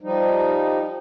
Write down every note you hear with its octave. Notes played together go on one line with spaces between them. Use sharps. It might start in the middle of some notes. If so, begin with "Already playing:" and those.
F3 G3 D#4